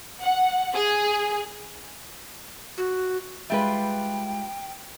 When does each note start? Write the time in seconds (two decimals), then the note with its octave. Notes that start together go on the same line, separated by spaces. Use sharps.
0.20 F#5
0.74 G#4
2.78 F#4
3.50 G3 G#3 F4 B4 E5 G5